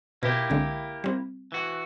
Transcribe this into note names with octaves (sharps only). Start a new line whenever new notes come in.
B2 A#3 E4 G4
C2 D3 G#3
G3 C4
E3 F#4